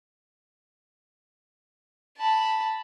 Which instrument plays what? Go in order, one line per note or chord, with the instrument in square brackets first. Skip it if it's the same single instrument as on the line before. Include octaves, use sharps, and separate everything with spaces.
[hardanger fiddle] A5 B5